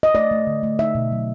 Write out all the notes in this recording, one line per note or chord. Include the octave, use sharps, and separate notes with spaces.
D#5
A3 D5
A3
D3
A3
D#4 E5
B2
F#3